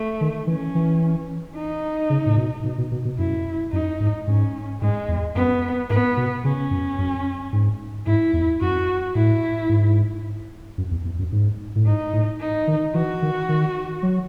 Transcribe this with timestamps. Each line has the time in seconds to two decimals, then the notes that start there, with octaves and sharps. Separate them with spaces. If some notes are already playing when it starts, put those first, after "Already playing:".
Already playing: A3
0.21 D#3
0.47 E3 C#4
0.75 E3
1.56 D#4
2.10 C#3
2.26 A2
2.37 B2
2.64 B2
2.78 B2
2.92 B2
3.05 B2
3.18 F#2 E4
3.72 F#2 D#4
4.00 G#2
4.27 G#2 C#4
4.81 G#2 G#3
5.08 E2
5.35 F#2 B3
5.90 G#2 B3
6.17 B2
6.44 C#3 C#4
6.71 F#2
6.98 F#2
7.53 G#2
8.07 G#2 E4
8.33 E2
8.61 F#2 F#4
9.15 A2 E4
9.69 G#2
10.78 F#2
10.91 E2
11.05 E2
11.19 F#2
11.32 G#2
11.76 A2
11.86 G#2 D#4
12.13 A2
12.40 D#4
12.67 D#3
12.94 E3 F#4
13.22 D#3
13.49 D#3
14.03 F#3